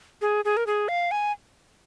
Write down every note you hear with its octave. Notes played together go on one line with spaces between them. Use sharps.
G#4
G#4
A#4
G#4
F5
G#5